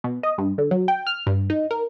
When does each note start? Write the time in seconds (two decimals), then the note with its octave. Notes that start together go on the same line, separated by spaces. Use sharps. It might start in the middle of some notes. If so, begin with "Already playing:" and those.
0.04 B2
0.23 D#5
0.38 G2
0.58 D3
0.71 F#3
0.88 G5
1.07 F6
1.27 G2
1.50 D#4
1.71 A#4